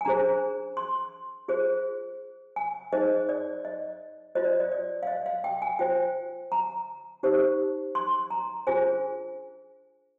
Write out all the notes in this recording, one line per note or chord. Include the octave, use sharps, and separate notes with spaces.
G#5
D4 G#4 C5 A#5
C6
F4 G#4 C5
G#5
D#4 G#4 C5 D#5
D5
D#5
F4 C5 D#5
D5
D5
D5
F5
D#5
F5
G5
G#5
F4 C5 G5
A#5
D#4 G4 C5
C6
A#5
D4 F4 G#4 C5 G#5